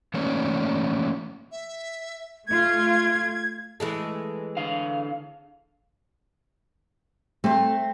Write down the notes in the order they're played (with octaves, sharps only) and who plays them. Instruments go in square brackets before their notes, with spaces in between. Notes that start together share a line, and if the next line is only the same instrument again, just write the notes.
[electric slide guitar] E3 A3 A#3 C#4 C#5 D5
[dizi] E5
[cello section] A3 F4 [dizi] G#6
[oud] E3 G#3 A3
[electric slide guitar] D3 F5
[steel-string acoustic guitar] A3 [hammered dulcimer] C4 C6